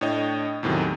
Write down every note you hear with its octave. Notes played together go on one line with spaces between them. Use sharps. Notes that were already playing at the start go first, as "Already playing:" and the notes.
A2 D4 C#5 D#5 G5
E2 A2 C3 D#3 F#3